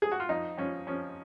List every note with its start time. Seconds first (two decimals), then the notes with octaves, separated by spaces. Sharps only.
0.02 G#4
0.12 F#4
0.20 F4
0.29 F2 D#4
0.58 F2 C#4
0.87 F3 C#4